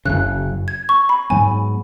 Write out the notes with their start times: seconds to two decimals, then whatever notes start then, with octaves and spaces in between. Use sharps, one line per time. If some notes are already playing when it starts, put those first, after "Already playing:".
0.05 F#1 F#2 C#3 F#6
0.68 G#6
0.89 C#6
1.09 B5
1.30 G#2 F#3 B3 G#5